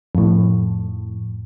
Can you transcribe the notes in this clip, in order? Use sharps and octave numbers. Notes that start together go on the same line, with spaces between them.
F2 A2